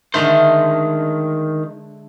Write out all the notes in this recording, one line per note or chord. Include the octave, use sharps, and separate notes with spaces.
D3 D#3 G#3 A3 C5